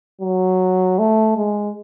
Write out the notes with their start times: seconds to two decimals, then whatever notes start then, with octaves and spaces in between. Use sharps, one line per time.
0.22 F#3
0.99 A3
1.37 G#3